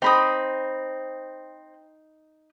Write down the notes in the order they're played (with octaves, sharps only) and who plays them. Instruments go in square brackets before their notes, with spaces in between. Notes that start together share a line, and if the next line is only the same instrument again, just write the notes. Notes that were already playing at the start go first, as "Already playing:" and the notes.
[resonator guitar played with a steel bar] C4 [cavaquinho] D#4 B5 D#6